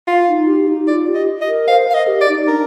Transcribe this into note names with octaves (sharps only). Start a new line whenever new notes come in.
F4
D#4
G4
D#4
F4 D5
G4
D#5
D#5
A#4
C5 F5
A#4 F5
D#5
G4
D5
D#4
D4 A#4